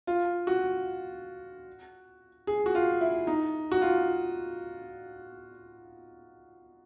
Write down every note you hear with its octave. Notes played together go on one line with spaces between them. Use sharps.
F4
F#4
G#4
F#4
F4
E4
D#4
F#4
F4